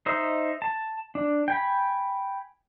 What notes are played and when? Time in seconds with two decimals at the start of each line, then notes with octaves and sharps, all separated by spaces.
0.06 D#4 C5 D#5 E5
0.62 A5
1.15 D4
1.48 G5 G#5 B5